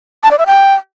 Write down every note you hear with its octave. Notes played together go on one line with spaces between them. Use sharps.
A5
D5
E5
G5